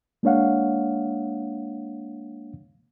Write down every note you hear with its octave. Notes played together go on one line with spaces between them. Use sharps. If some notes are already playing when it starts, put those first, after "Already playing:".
G#3 A#3 D4 C#5 F5 F#5